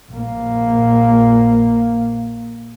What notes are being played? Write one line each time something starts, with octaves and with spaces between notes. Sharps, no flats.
A#1 A#3